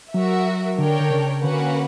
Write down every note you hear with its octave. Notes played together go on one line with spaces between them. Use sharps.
F#3 F#4 A#4 E5
D3 D4 A#4 C#5 G5
D3
C#3
D3 A#3 C#4 F#4 B4 F#5